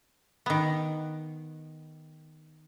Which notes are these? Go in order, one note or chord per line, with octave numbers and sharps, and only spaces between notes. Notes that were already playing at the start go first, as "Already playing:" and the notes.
D#3 B3